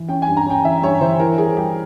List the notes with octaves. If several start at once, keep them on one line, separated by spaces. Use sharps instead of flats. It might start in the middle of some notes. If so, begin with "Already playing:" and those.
Already playing: E3
C#4 G5
G#5
G2
A#5
C#4 G5
E3 E5
G2 C#5
E3 C5
E4 A#4
G3 G#4
G3 G4